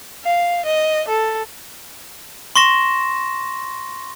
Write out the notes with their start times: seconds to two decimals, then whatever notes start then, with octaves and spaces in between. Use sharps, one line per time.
0.24 F5
0.65 D#5
1.08 A4
2.56 C6 C#6 A#6 E7